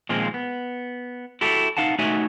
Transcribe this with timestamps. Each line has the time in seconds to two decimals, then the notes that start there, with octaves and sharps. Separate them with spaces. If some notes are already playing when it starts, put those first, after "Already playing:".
0.09 A#2 D#3 F3 G#3 A#3 C4
0.34 B3
1.41 E4 F#4 G4 A4 E5
1.77 D#4 F5 F#5 A5
1.99 A3 D#4 F#4 C#5 E5 G#5